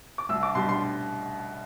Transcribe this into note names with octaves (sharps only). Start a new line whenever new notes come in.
D6
C2 E6
D6
B2 G3 C6
C6